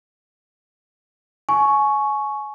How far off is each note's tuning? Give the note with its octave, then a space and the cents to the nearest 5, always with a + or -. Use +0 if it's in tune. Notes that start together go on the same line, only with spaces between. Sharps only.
G#5 +30 C#6 +0